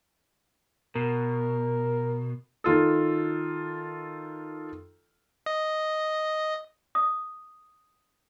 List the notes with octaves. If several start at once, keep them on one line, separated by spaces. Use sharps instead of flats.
B2 A#4
D#3 F4 A4
D#5
D#6